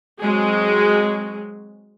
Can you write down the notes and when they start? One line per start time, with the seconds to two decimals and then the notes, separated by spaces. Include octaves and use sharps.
0.19 F#3 G#3 C4 F#4 G#4